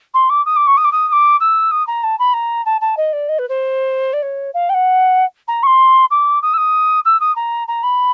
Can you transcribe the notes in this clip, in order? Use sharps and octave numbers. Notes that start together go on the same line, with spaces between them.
C6
D6
D#6
D6
C#6
D#6
D6
D#6
D#6
D6
E6
D#6
A#5
A5
B5
A#5
A5
A5
D#5
D5
D#5
B4
C5
D5
C#5
F5
G5
F#5
A#5
C#6
C6
D6
D#6
E6
D#6
E6
D#6
A#5
A#5
B5